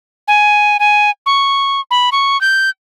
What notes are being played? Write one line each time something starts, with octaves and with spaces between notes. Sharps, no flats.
G#5
G#5
C#6
B5
C#6
G6